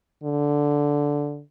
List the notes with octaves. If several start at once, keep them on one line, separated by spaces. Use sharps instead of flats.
D3